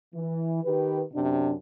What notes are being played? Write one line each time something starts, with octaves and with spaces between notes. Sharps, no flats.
E3
D#3 G4 B4
F#2 C3 D4